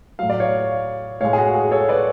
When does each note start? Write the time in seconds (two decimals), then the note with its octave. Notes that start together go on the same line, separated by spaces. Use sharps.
0.19 A2 F#3 F5
0.30 D5
0.40 C#5 F5
1.21 A2 G#3 C#5 F5
1.33 G#4
1.38 F#4
1.55 G#4
1.71 A4 C#5
1.89 B4 D5